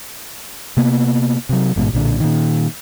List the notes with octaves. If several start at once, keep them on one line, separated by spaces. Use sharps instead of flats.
C3 A#3 B3
C3 F#3
A1 G#2 B2
B1 A#2 D3
A#2 D#3